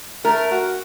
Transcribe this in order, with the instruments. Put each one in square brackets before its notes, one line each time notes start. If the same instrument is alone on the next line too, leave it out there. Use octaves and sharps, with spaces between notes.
[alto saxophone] A3 [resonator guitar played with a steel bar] A#4
[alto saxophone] F#4